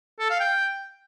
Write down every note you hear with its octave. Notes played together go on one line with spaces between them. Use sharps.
A4
F5
G5